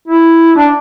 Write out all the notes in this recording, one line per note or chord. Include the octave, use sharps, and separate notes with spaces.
E4
D4